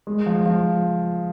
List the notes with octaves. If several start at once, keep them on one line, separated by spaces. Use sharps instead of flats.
G#3
F3
F3